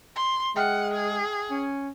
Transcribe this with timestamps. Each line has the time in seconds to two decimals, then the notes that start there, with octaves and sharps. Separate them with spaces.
0.16 C6
0.56 G#3 E5 F#5 G5 F6
0.93 G#4
1.50 C#4